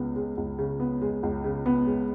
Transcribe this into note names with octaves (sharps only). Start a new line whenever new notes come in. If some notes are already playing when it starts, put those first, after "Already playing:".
Already playing: C#2 C#3 B3
G#3
C#2
C#3
B3
G#3
C#2
C#3
B3
G#3